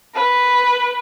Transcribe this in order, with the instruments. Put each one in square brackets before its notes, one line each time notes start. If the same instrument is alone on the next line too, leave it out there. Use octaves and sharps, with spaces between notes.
[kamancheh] B4